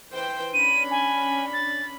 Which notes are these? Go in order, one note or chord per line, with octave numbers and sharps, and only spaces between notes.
E3 C5 G5
C#4 D4 B5 D#7
G#5
A6